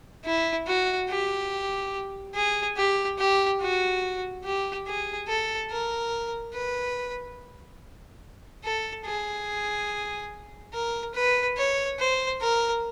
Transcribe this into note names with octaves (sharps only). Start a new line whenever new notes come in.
E4
F#4
G4
G#4
G4
G4
F#4
G4
G#4
A4
A#4
B4
A4
G#4
A#4
B4
C#5
C5
A#4